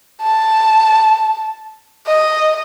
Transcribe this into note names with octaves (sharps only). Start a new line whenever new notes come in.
A5
D#5